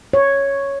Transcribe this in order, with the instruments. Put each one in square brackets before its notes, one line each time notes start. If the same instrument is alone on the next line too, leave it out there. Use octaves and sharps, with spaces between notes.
[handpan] C#5